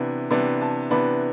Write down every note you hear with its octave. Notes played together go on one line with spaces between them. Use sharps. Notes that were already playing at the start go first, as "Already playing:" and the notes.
Already playing: C3 E3 B3 D4
C3 E3 B3 D4
A5
C3 E3 B3 D4 B5